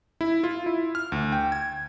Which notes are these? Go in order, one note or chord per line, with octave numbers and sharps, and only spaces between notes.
E4
F4
E4
F6
D2
G5
G#6